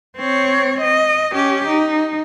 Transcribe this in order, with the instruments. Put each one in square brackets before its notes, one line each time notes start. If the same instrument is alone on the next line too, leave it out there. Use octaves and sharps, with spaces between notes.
[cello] C4 C#5
D#5
C#4 G4
D#4